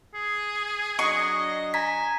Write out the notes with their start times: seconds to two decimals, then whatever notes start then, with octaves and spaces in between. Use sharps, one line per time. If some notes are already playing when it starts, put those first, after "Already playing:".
0.14 G#4
0.99 F#3 D4 D#5 C#6
1.74 G#5 A#5 B6